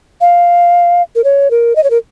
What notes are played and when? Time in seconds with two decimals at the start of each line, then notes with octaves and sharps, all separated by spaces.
0.21 F5
1.15 A#4
1.24 C#5
1.51 A#4
1.76 D#5
1.84 C#5
1.90 A#4